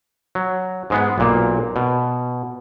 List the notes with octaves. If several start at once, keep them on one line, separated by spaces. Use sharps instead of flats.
F#3
G#2 G#3 B3
B1 A#2 A#3
B2